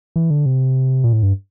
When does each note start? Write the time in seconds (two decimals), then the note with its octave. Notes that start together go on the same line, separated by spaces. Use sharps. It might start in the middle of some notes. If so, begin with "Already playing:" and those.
0.16 E3
0.30 D3
0.46 C3
1.04 A#2
1.13 A2
1.23 G2